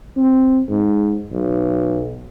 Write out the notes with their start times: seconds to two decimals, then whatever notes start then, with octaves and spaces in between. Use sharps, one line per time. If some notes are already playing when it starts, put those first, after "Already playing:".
0.16 C4
0.69 G#2
1.32 B1